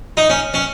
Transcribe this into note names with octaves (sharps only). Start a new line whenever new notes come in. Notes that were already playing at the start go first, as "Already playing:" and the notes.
D#4
C#4
C#4